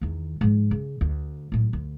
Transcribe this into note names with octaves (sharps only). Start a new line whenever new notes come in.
E2 D#3
G#2 F3
C#3
D2
F#2 A2
D2